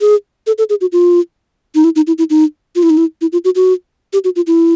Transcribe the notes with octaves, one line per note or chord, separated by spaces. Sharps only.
G#4
A4
A4
G#4
F#4
F4
D#4
E4
D#4
E4
E4
D#4
F4
E4
D#4
E4
E4
F4
F#4
F#4
G4
F#4
F4
E4